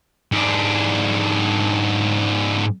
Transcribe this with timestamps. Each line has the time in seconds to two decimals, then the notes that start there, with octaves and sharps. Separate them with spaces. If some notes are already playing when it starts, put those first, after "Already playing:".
0.32 G#2 D4